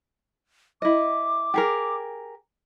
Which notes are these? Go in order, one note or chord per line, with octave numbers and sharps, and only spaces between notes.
E4 D#5 D6
G4 G#4 A#4